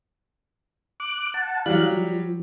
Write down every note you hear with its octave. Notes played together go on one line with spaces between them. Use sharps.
D6 F#6
F#5 A5
E3 F#3 G3 F5 F#6
F3